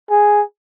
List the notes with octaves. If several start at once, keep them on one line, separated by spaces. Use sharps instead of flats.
G#4